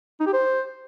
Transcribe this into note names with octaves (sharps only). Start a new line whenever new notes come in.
D#4
G4
C5